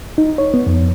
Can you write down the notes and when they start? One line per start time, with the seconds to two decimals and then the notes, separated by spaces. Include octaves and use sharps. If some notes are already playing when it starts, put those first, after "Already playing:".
0.18 D#4
0.38 C#5
0.54 B3
0.66 F2